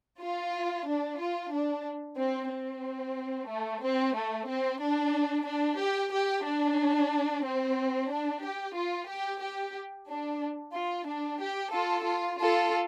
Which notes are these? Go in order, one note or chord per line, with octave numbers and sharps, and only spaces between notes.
F4
D4
F4
D4
C4
C4
A3
C4
A3
C4
D4
D4
G4
G4
D4
C4
D4
G4
F4
G4
G4
D4
F4
D4
G4
F4 A4
F4
F4 A4